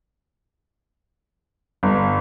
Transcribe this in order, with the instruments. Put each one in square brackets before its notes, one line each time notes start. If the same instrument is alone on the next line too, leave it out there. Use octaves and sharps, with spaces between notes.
[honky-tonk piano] G1